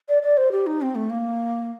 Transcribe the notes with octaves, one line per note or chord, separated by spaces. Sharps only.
D5
D5
C5
G4
D#4
C4
A3
A#3